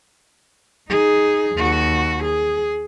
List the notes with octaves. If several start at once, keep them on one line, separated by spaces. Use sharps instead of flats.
D#4 G#4
D#2 F#4
G#4